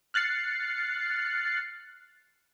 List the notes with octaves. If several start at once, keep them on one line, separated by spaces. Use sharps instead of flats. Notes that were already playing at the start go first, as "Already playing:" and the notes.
F6 F#6 A6 C7 C#7